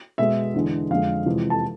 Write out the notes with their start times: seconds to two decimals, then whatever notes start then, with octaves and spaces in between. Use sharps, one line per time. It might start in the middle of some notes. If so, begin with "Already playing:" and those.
0.18 B2 G#3 E5
0.54 E2 D3 G#3
0.90 F2 D3 G#3 F5
1.26 E2 C3 F3 G#3
1.50 A5